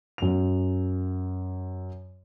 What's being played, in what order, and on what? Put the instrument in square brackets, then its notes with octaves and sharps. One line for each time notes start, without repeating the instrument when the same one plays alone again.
[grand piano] F#2 F7